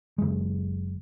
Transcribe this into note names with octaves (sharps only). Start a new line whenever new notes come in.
F#1 G#3